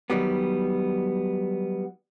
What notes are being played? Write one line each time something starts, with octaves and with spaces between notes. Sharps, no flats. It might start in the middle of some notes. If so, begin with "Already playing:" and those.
D#3 F#3 G3 B3